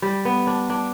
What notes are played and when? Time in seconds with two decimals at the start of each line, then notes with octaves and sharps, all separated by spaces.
0.02 G3
0.25 B3
0.47 D4
0.70 D4